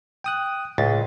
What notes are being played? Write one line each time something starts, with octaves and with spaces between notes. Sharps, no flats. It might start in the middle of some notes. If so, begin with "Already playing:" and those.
G5 D#6 F#6
C#2 A2 A6